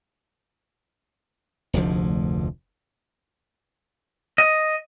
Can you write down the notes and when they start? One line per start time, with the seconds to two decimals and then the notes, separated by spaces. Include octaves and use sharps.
1.74 F1 D2 G#2 F3
4.38 D#5